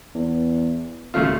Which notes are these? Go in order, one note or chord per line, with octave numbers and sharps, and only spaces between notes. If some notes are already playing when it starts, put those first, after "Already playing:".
E2
D#1 D2 A3 F4